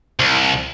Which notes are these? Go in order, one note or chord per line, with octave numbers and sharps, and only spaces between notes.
C2